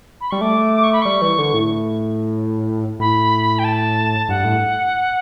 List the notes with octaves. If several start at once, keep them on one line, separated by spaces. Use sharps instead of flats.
B5
G3 C#6
A3 D6
D6
C#6
B5
G3 C#6
E3
D3
A2
A2 B5
G5
A5
G2 F#5
A2